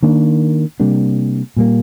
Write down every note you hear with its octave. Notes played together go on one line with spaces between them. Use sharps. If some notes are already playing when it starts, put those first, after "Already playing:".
D#3 A#3 D4
C3 G3 A#3 D4
A#2 G3 A#3